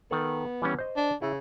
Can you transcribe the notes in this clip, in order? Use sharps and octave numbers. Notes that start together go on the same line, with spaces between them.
D#3 B3 A4
E3 G3 C#4
C5 D#5
D4
C#3 E4